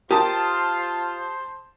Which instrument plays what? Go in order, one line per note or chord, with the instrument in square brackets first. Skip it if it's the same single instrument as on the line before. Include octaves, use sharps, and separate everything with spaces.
[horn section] F4 [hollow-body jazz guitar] G4 A#4 [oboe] C5 [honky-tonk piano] A5 D#6